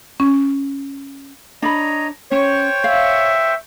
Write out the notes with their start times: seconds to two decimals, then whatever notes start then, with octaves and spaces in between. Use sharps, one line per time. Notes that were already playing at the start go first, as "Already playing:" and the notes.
0.20 C#4
1.62 D4 C#5 D#5 A#5 B5
2.32 C#4 C5 C#5 G5 C#6
2.84 E5 F5